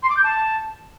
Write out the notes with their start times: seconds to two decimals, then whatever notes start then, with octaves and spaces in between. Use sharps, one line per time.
0.03 C6
0.10 D6
0.17 G6
0.24 A5